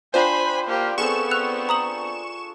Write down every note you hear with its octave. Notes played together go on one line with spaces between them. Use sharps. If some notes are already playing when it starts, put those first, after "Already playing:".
D4 F4 C5 G5 G#5 B5
A#3 G4
B3 C4 G#4 A4 C#6 E7
E6 F#6 F7
A#5 D#6 F#7